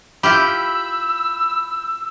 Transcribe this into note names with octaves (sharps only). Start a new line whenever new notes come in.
E4 F4 G4 B5 E6 G6